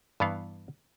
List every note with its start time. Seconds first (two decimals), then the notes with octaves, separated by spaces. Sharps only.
0.20 G2 E3 B3 F5